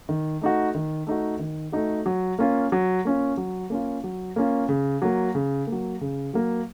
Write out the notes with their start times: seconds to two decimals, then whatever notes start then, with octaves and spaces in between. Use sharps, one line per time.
0.09 D#3
0.41 A3 D#4 F#4
0.75 D#3
1.07 A3 D#4 F#4
1.39 D#3
1.72 A3 D#4 F#4
2.06 F#3
2.39 A#3 C#4 F4
2.72 F#3
3.05 A#3 C#4 F4
3.37 F#3
3.70 A#3 C#4 F4
4.04 F#3
4.36 A#3 C#4 F4
4.69 C#3
5.02 F#3 A#3
5.35 C#3
5.67 F#3 A#3
6.01 C#3
6.34 F#3 A#3